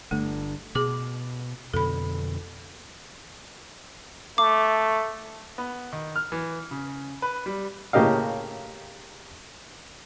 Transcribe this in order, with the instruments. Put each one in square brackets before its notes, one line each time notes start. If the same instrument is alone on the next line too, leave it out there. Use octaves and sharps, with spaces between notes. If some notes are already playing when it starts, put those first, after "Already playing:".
[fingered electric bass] G1 D3 D4 [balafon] A3
[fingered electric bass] B2 [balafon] G#4 D6
[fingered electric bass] F2 B2 D3 [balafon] A4 B5
[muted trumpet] A3 [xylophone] D6
[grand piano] B3
D#3
F6
E3
C#3
B4
G3
[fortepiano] A2 C#3 A#3 G4 D#5 F5